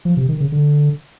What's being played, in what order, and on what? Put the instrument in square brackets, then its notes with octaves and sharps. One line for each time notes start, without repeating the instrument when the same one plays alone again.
[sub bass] F3
C3
D#3
C#3
D3